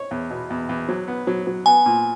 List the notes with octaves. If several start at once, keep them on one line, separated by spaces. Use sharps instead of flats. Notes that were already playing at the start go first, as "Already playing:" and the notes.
Already playing: C#5
E2
B2
E2
E2
F#3
B3
F#3
F#3
B3 G#5
A#2